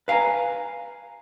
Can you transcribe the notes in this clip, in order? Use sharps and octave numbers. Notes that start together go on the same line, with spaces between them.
B4 F5 F#5 G#5 A#5